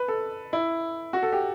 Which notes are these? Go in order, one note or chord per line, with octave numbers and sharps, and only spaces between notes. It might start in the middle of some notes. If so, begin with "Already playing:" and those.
Already playing: B4
A4
E4
F#4
A4
G4